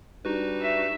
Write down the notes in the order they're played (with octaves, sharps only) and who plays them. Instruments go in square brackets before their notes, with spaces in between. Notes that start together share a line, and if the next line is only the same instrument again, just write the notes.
[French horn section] G3 D4 [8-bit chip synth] D#4 F#4 B4
[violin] E5